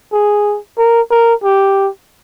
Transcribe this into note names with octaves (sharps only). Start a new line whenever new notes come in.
G#4
A#4
A#4
G4